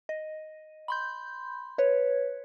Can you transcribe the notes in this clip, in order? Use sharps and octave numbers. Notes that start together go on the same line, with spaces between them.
D#5
B5 C6 G6
B4 C#5